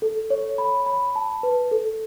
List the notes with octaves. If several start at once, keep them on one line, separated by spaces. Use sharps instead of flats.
A4
C#5
B5
B5
A5
B4
A4